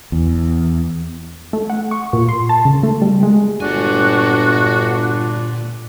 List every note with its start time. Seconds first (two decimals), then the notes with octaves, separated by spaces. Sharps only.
0.12 E2
1.53 A3
1.70 F#5
1.91 C#6
2.13 A#2
2.29 C6
2.49 A5
2.65 C#3
2.83 A3
3.02 G3
3.23 G#3
3.60 G1 A#2 D4 F#4 G#5